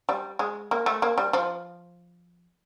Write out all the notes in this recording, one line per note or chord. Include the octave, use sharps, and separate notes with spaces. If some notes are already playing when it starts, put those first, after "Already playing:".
G3
G#3
A#3
A3
A#3
G3
F3